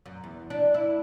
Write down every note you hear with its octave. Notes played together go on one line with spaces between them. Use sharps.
F#2
E2
D4
E4